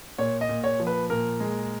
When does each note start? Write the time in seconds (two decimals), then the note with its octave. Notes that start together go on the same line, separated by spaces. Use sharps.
0.18 A#2 C#5
0.41 D#5
0.49 A#2
0.64 C#5
0.80 F3
0.87 B4
1.10 A#2 A#4
1.40 G#3